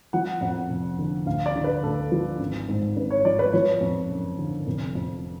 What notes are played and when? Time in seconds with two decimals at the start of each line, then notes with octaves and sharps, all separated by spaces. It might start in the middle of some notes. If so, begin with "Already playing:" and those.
0.13 F3 F#5
0.41 F2 F#5
0.70 F1
0.99 D3
1.26 D2 F5
1.46 D5
1.56 D3
1.64 B4
1.83 D2 A4
2.12 F3
2.40 G#1
2.68 G#2
2.96 G#1 B4
3.11 C#5
3.25 F3 D5
3.39 B4
3.53 F3 C#5
3.81 F2
4.10 F#1
4.39 D3
4.67 F1
4.95 F2